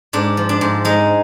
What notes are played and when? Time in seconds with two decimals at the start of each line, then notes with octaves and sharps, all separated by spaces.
0.13 G#2 D4
0.37 F3
0.49 D4
0.61 G#2
0.85 G#3 D#4